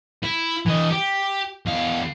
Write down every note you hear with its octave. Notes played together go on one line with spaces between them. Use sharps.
E4
E3 D#5
G4
E2 F5